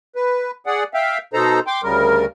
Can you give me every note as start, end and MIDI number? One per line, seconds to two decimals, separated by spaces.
0.15 0.51 71
0.66 0.84 68
0.66 0.84 74
0.66 0.84 78
0.94 1.18 76
0.94 1.18 77
0.94 1.18 79
1.33 1.60 47
1.33 1.60 63
1.33 1.60 69
1.33 1.60 72
1.33 1.60 82
1.67 1.81 79
1.67 1.81 84
1.67 1.81 86
1.83 2.25 38
1.83 2.25 49
1.83 2.25 55
1.83 2.25 70